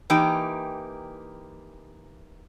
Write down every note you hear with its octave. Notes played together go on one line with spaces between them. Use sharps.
E3 A#3 D#4 G4 G5